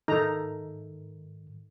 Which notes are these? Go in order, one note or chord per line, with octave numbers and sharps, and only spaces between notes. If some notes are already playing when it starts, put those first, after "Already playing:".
G#2 D#3 D#4 A4 A#5